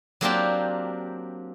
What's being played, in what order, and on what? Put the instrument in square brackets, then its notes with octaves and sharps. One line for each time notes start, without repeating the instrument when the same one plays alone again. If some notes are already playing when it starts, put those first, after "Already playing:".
[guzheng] F#3 A#3 C4 D4 F4 G4